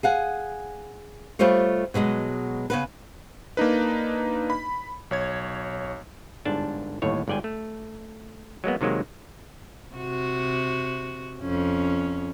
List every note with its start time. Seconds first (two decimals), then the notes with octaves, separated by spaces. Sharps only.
0.03 G#4 F5 F#5 G#5
1.39 G3 A3 F4 G4 C5 C#5
1.94 B2 F#3 G#3 D#5
2.70 C#3 B3 B4
3.57 A#3 D4 D#4 B4
4.50 B5
5.11 B1 C#5 G#6
6.45 G1 G#2 D4 A5
7.02 G1 D#2 A2 C#5
7.28 G1 G#2 D5 G5 G#5
7.44 A3
8.64 F#3 G#3 A#3 B3
8.81 C3 D#3 F#3 G#3 A#3
9.95 C3 F#4
11.40 F2 C#4